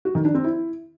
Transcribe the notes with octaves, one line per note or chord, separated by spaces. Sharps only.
F#4
D#3
D4
C4
E4